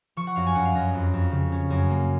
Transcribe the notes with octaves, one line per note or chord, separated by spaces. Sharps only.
F3 C#6
F#5
F#2 F5
G#5
F#2 F#5
F5
F#2 D#5
F2
F2
C#3
C#4
F#2 G#5
A#3